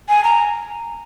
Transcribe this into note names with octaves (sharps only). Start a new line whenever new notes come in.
G#5
A#5